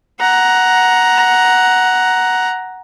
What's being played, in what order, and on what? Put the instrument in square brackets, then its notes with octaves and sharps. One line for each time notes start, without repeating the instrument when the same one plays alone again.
[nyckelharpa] F#5 A#5